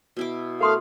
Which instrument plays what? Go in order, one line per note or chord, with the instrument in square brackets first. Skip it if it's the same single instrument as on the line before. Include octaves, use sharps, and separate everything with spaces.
[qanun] B2 E4 D6
[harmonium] A3 F5 [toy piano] A#4 C6 D#6